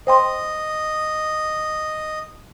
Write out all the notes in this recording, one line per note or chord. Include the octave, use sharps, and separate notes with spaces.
C5 D#5 G5 C6